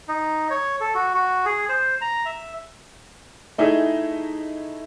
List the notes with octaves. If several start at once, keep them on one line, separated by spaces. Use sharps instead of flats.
D#4
C#5
A4
F#4
F#4
G#4
C5
A#5
E5
A3 D#4 E4 G#4